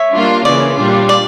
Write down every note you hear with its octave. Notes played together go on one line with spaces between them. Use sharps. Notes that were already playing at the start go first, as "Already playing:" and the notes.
Already playing: C#5 E5
G3 A#3 D4 F4
C#3 E3 A#3 C#4 D5
A#2 G3 D4 F4
D5